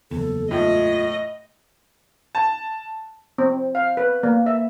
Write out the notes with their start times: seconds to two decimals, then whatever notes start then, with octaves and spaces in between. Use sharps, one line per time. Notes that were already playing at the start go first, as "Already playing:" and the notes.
0.11 F#1 E2 A4
0.51 A2 F4 D#5
2.35 A5
3.38 C4
3.75 F5
3.97 B4
4.23 A#3
4.46 E5